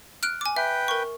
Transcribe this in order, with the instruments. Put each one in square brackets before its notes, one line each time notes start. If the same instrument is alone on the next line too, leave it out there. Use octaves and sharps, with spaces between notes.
[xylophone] F6 F#6 D7
G#5 D6
[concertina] B4 G5 [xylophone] E5
[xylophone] A#4 C#6